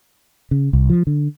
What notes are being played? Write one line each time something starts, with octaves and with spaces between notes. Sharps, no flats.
C#3
C2
F3
D3